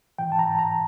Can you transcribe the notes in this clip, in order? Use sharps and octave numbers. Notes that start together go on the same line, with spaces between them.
G#2 E3 G5
A5
A#5
A#5